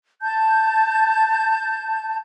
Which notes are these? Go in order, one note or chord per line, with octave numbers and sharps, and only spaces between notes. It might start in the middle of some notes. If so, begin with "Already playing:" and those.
A5 G6